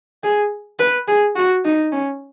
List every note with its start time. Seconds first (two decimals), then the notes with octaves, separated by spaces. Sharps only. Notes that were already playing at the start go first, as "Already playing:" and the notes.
0.23 G#4
0.79 B4
1.08 G#4
1.36 F#4
1.64 D#4
1.92 C#4